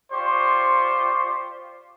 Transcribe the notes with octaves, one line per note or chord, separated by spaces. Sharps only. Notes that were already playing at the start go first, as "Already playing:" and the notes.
F4 G4 C5 D5 C#6